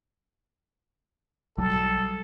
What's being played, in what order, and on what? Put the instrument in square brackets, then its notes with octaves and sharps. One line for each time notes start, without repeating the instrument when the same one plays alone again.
[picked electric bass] B1 F#3 G3 [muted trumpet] A4